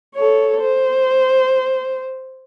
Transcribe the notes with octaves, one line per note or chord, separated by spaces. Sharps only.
A4 C#5
C5